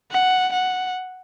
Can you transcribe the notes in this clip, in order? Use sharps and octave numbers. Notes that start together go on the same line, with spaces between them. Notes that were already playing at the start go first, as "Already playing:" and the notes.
F#5
F#5